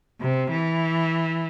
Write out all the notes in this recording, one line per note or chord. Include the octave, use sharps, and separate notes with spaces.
C3
E3